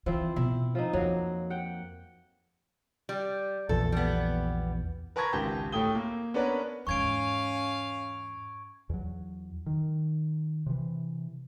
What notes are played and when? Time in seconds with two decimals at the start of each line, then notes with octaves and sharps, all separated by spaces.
0.06 E3 F3 C4 E4
0.36 B2 E4
0.75 F3 C4 D#4
0.93 F2 F#3 A#3
1.50 F#5 G5
3.09 G3
3.69 A#1 E2 A4
3.92 G3 B3
5.16 A#4 B4 A5 C#6 G#6 A#6
5.33 G#1 C#2 G4 A5 G6
5.72 A2 A3 A4 G5 D#6 G7
5.95 A#3
6.34 B3 C#4 D4 A#4 B4 C#5
6.87 E2 G#2 C#4 F5 C#6 G#6 D7
8.90 E2 F#3
9.66 D#3
10.66 C3 E3